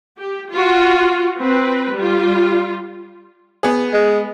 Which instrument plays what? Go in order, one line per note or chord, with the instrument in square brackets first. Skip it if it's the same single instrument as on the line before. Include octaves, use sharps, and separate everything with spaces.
[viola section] G4
F4 F#4
C4 B4
G3 F4
[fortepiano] B3 G#4
[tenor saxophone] G#3